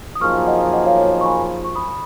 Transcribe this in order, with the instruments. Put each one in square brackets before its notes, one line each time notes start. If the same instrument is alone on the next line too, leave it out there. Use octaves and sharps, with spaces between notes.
[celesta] D#6
[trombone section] F#2 F3 A#3 D#4 G#4 [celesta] C#6 F6
[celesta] D#5 F#5
D#5 F#5
C#5 F5
C#5
D#5
C#6
G#5 B5
C#6
B5 D#6